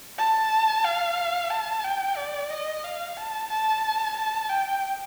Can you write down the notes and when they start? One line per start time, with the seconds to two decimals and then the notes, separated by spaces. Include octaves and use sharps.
0.18 A5
0.84 F5
1.50 A5
1.84 G5
2.17 D5
2.50 D#5
2.84 F5
3.17 A5
3.50 A5
4.17 A5
4.49 G5